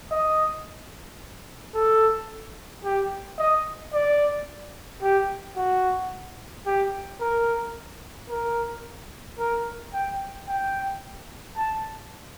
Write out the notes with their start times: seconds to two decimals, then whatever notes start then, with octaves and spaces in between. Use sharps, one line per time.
0.12 D#5
1.75 A4
2.85 G4
3.39 D#5
3.94 D5
5.02 G4
5.57 F#4
6.67 G4
7.20 A#4
8.30 A#4
9.39 A#4
9.94 G5
10.48 G5
11.57 A5